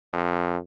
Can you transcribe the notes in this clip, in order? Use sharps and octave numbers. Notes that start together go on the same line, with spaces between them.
F2